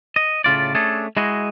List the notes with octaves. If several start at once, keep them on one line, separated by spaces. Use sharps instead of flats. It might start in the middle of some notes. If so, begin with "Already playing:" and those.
D#5
A2 C#3 F4 D5
A3 C#4 D4 G#4 A4
G#3 E4 F#4 G#4 D#5